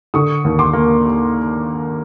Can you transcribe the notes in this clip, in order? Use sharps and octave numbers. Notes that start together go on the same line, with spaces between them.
D3 C#6 D#6
D#2
C6 D6
A#3